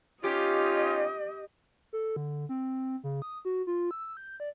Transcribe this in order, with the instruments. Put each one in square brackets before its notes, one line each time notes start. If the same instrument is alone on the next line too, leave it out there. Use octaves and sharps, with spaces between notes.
[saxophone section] C#4 D#4 F4 [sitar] G4 [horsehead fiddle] D#5
[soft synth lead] A4
D3
C4
C#3
D#6
F#4
F4
E6
G6
D5